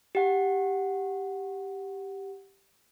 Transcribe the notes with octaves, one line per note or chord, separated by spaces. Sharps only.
G4 F#5